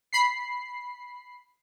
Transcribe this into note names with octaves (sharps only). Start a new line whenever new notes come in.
B5 C7